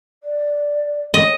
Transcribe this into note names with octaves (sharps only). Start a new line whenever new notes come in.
D5
C#5 D#5